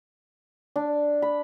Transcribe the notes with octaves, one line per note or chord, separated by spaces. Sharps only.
D4
B5